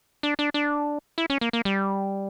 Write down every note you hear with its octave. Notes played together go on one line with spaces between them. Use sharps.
D4
D4
D4
E4
C#4
A#3
A#3
G3